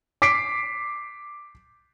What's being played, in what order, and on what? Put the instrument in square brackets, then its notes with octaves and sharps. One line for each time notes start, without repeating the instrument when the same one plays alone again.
[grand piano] D6 B6 C7 D7